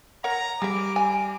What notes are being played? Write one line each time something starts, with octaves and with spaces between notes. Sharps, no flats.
A#4 C#5 F#5 A#5
G3 G#4 E5 D6
G#5